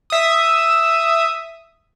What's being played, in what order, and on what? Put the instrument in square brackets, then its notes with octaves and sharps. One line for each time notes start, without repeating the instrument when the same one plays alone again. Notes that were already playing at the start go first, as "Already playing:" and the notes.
[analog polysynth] E5 D#6